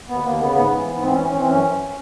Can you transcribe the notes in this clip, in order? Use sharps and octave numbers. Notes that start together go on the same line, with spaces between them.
D#2 B3
D#2 A#3
C#3 B3
G#2 B3
E3
G#2
E3 C4
C#4
E3
C#4
E3 C4
F#2 C#4
F#2